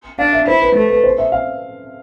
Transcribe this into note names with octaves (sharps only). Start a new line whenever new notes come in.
D4 F5
E5
E4 C5
B4
A3 A4
B4
C5
E5
F5